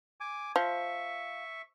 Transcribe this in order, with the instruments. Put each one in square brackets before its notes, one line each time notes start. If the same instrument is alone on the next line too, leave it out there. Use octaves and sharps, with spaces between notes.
[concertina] G#5 D6
[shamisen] F3 [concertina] E5 C#6